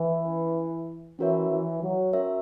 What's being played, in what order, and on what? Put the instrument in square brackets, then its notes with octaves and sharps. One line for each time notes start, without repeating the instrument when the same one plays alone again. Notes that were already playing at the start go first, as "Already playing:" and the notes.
Already playing: [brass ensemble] E3
[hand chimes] C#4 E4 B4
[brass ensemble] E3 [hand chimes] C#4 F#4 A#4 C#5 E5
[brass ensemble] E3
F#3
[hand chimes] C#4 F#4 A#4 C#5 E5